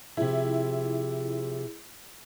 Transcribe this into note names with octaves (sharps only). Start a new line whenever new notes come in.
C3 F3 E4 G#4